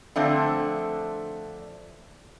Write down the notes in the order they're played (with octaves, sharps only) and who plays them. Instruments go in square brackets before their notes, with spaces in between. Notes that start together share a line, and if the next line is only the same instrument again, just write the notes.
[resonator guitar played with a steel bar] D3 F3 A3 C4 D4